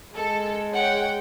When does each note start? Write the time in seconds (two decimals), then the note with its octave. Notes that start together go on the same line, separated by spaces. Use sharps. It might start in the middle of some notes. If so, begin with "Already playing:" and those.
0.16 G#3 A4
0.74 C#5 F#5 G5